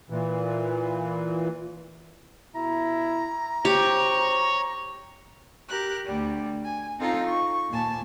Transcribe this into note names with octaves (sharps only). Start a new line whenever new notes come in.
A#2 E3
B2 E4 A#5
G#1 G4 C5 C#5
G4 A#4 F#6
D2 G3
G#5
C4 D#4 F4 A4 F5 A#5
C#6
D#2 A#2 G#5 A5